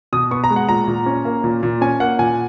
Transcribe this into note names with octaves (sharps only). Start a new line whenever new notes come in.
B2 D#6
B3 C#6
A#5
G#3
F#5
A#2 A#5
A#2
C#4
A#3
A#2
A#2
C#4 G#5
A#3 F#5
A#2 G#5